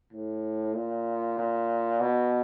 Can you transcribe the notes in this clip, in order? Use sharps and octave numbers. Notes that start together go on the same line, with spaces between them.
A2
A#2
A#2
B2